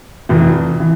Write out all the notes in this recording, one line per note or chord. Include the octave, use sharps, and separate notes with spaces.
F1 F2 E3
E3